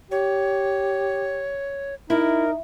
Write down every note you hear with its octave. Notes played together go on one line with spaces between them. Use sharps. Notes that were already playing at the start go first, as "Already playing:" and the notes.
G4 C#5
D#4 E4 A#4